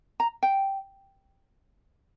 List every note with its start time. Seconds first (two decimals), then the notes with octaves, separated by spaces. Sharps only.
0.20 A#5
0.43 G5